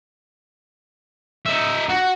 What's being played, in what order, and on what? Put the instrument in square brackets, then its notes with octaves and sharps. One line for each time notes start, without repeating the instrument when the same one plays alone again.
[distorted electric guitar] D#4 E5
F#4